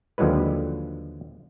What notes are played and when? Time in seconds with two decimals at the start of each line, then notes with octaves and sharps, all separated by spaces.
0.18 D#2 D3 F3 F#3 G#3 B4